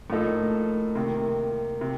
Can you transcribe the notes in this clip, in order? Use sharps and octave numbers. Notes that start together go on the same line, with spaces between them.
A2 F3 A#3 D#4 A4
C3 D#3 A#3
C3